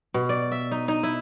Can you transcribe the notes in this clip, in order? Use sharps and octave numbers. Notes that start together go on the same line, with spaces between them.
B2
D5
E5
D#4
D#4
E4